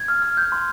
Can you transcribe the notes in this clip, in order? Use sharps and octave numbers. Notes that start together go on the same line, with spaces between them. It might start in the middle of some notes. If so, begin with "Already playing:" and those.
Already playing: G#6
F6
F6
G6
C6